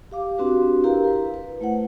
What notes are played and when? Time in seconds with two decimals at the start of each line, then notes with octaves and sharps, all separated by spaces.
0.11 G4 F5 D6
0.38 C4 D4 F#4 G4 B4
0.84 E4 G4 A#4 F5 A#5
1.08 B4
1.34 B4
1.61 A3 E4 C5 F#5